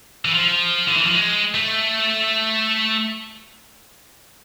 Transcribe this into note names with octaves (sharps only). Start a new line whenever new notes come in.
E3
F3
D3
E3
F3
G#3
A3